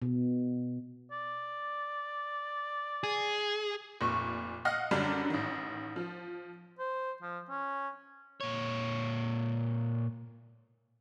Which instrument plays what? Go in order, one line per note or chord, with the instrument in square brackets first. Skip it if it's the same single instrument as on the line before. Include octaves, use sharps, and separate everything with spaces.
[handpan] B2
[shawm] D5
[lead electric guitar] G#4
[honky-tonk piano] F1 A#2 C#6
D#5 F5 F#5 F6 A#6
F#2 D3 F#3 G3 D4
A1 D#3
F3
[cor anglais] C5
F3
C#4
[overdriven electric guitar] A#2 C#5